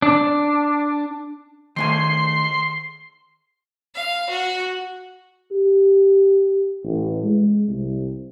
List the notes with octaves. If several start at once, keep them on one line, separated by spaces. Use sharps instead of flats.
D4
D#3 A3 G#5 C6
F5
F#4
G4
A1
G#3
C2